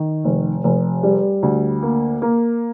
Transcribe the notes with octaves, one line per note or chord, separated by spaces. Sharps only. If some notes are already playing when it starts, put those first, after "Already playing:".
Already playing: D#3
F1
F1
G3
D2
A#3
A#3